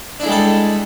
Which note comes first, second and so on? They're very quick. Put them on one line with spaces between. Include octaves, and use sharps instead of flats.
D4 E4 G#3 G3 A4